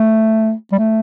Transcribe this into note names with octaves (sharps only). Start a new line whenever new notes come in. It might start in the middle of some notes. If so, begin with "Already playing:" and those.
Already playing: A3
G3
A3